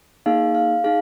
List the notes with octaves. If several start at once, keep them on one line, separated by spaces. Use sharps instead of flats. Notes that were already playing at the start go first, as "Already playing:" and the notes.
A#3 D#4 G#4 F5
F5
D#4 G#4 F5